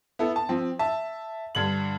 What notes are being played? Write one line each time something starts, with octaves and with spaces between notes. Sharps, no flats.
B3 E4 A4
A5
F3 C4
E5 A5
G2 D3 G#6 F#7